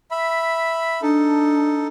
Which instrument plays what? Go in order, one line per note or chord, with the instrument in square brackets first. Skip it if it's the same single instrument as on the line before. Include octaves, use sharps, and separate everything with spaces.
[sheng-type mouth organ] E5 B5
[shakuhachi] D4 [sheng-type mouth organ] D#4 A4